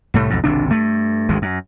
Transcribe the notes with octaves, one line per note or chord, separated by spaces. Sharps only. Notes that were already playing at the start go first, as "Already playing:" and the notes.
C2 A2 A3
B1 F2 G#2
G#1 C#2 C3 D4
G2 A3
G#1 D2 G#3
F#2